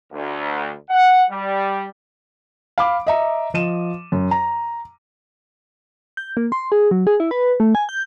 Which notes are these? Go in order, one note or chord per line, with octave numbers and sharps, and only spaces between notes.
D2
F#5
G3
F5 B5 D6
D#5 E5 A#5
F3 D#5 D#7 E7
F#2
A#5
G6
A#3
C6
G#4
F#3
G#4
E4
B4
A3
G#5
G6